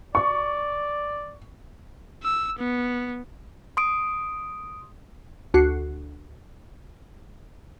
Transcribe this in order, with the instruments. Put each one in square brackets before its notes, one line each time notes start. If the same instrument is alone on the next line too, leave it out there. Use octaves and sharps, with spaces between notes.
[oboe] D5 [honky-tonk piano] C#6
[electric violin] E6
B3
[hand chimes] C6 D#6 D7
[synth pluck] D2 F#4 C7